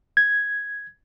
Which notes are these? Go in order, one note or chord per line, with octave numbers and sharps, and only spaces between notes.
G#6